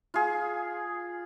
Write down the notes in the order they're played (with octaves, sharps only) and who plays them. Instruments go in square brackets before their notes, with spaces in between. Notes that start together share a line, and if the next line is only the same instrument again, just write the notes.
[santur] F4 G#4